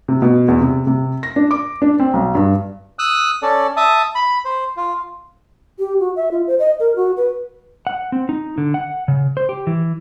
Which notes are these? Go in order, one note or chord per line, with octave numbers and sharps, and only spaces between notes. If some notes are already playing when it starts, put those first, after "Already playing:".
C3
B2
E2
C3
C3
A#6
D4
D6
D4
C4
B1
G2
D#6 E6 F#6
C#4 A4 D5
E5 A5 D#6
B5
C5
F4
G4
F#4
E5
F4
C5
D#5
A#4
F#4
B4
F#5
C4
D#4
D3
F#5
C#3
C5
G4
E3